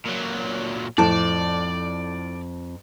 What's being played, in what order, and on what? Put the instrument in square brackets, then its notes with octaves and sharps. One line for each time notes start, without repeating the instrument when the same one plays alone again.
[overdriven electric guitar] A#2 F#3
[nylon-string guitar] F2 A5 [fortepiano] A2 [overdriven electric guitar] D5